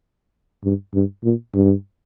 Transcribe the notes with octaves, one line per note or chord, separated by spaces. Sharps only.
G2
G2
A#2
G2